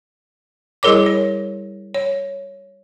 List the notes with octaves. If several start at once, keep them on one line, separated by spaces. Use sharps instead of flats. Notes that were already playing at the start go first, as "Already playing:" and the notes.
G3 E4 G#4 A#4 C#5 D6
C#5
C#5